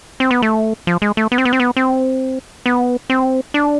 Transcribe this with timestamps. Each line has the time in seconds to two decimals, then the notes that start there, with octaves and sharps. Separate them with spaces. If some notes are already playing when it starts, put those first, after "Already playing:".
0.20 C4
0.31 B3
0.42 A3
0.87 F3
1.02 G#3
1.17 A3
1.32 B3
1.38 C4
1.45 B3
1.53 C4
1.60 B3
1.77 C4
2.66 B3
3.10 C4
3.54 D4